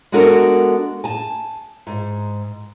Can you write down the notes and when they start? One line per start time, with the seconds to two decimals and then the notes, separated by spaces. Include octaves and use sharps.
0.12 G#3 B3 D4 F#4 A4 A#4
1.04 G#5 A5
1.87 G#2